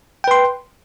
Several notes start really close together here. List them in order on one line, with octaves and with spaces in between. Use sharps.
G5 B4 C6